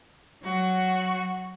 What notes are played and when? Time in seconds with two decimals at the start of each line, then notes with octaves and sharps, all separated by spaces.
0.42 F#3 F#4